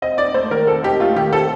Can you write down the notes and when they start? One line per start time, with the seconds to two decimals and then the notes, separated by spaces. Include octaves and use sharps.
0.02 C4 D#5
0.18 D#4 D5
0.34 A3 C5
0.51 D#3 A#4
0.67 C4 A4
0.83 D#4 G4
1.00 A3 F4
1.16 D#3 G4
1.33 C4 A4